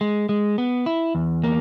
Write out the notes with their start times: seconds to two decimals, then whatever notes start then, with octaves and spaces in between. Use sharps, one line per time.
0.01 G#3
0.29 G#3
0.58 B3
0.86 E4
1.15 E2
1.44 A#3